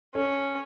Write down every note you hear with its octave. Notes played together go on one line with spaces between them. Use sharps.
C#4 A4 C#5